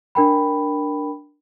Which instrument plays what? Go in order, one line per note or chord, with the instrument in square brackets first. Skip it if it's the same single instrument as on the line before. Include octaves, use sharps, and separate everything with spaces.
[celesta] D4 A#4 G5 B5